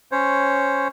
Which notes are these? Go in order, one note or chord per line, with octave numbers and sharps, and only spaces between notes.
C#4 C5 C#5